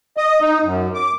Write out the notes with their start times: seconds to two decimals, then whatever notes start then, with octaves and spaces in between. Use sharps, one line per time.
0.17 D#5
0.42 D#4
0.63 F#2
0.94 D6